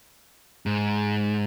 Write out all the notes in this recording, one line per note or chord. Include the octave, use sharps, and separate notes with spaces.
G#2